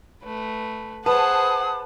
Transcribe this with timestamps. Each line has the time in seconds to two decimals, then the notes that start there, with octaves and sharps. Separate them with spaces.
0.24 A3 B4
1.06 G#4 B4 C5 F#5 A5 D#6